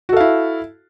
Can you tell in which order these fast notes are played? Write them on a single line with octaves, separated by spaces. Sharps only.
F#4 A4 F5 E4